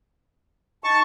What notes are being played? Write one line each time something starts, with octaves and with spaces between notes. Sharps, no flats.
D#4 A5 C#6